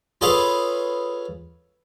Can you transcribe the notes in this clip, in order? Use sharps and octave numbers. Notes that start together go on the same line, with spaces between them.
F4 G#4 A4 B4 C#5 F5